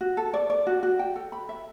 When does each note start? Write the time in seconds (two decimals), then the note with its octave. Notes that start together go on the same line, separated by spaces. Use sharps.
0.01 F#4
0.17 A4
0.34 D5
0.50 D5
0.67 F#4
0.83 F#4
0.99 G5
1.16 A4
1.32 B5
1.49 E5